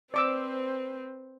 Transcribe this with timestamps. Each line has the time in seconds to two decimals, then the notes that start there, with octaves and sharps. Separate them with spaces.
0.14 C4 B4 C5 D5 D6 E6